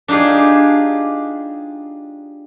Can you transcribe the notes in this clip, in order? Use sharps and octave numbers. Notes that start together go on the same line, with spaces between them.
D4 D#4 F4 G4 G#4